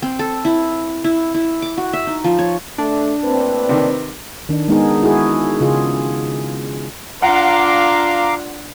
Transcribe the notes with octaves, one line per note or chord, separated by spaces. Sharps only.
C4
A4
E4
E4
E4
D6
F#4
E5
D#4
F3
C#5
A3 D4
A2 A#3 C4 B4
C3 D#3
D#3 D4
G#3 B3 D#4 G#4
E4 F#4 G#4
C#3 F4 G#4
D4 F4 F5 F#5 A#5 D6